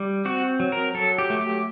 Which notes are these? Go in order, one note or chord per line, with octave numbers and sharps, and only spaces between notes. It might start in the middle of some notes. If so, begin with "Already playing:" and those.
Already playing: G3
C4 F#4
F#3
A#4
F#3 A4
G4
A3
G4